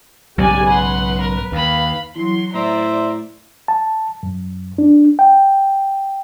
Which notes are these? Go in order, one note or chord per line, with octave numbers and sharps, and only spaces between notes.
B1 G#2 C#3 G4 D5 G#5
B4 F#5 C6
A#4
D#2 F5 B5
E3 F#3 C6
A2 C5 D5 E5 A#5
A5
F#2
D4
G5